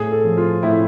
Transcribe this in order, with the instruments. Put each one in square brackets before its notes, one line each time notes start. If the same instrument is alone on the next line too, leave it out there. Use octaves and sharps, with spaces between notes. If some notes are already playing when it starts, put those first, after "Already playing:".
Already playing: [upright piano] A2 G#4
A4
F3
F4
A2 E4